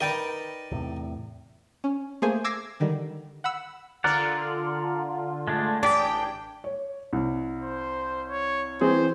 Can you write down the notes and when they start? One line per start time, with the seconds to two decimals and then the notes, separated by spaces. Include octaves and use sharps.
0.01 D#4 A#4 B4 D5 D#5 G5
0.71 E2 A2 C3
1.84 C#4
2.22 A3 A#3 G#4 C5 G#5
2.44 D6 E6 G#6 A#6 C7
2.80 D3 D#3 G3
3.44 F#5 B5 E6
4.04 D3 F4 A#4 D5 F#5
5.48 G#3 A3 D4
5.83 A1 D4 G4 G#4 D5 G5
6.64 C#5
7.13 C2
7.62 C5
8.28 C#5
8.81 E3 C4 G#4 C5